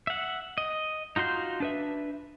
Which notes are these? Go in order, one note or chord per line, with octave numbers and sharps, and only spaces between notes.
E5 F#5
D#5
D#4 F4 F#4 C6 G6
D4 B4 E5